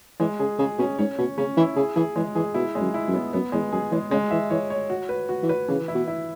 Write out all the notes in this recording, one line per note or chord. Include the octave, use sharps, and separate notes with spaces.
E3 G#3
C#3 G#4
C#3 G#4
B2 C#4
G#2 C#5
B2 C#4
C#3 C#4
E3 E4
C#3 G#4
E3 G#4
E3 G#3
E3 G#4
B2 E4
G#3
F#2
E4
F#2
B3
F#2 B3
E2 G#3
F#2 G#4
E3 G#3
C#3 G#3
E3 E5
E3 C#5
C#5
F#4
B4
F#4
E3
B4
C#3 E3
E4
B2
E4